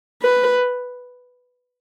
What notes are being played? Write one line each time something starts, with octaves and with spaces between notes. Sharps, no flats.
B4